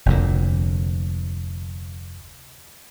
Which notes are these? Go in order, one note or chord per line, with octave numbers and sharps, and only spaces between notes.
F1 D2 A#2